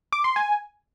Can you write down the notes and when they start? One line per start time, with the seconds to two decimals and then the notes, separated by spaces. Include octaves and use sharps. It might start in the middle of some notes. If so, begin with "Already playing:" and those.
0.13 D6
0.24 C6
0.36 G#5